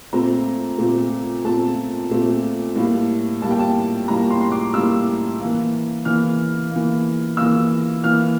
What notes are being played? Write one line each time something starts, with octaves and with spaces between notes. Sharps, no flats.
A#2 A3 C4 A#5
A#2 A3 C4
A#2 A3 C4 A5
A#2 A3 C4
A2 G3 A#3
A2 G3 A#3 A5
G5
A5
A2 G3 A#3 A#5
C6
C6
D6
A2 G3 A#3 E6
E3 A#3
E3 A#3 F6
E3 A#3
E3 A#3 E6
E3 A#3 F6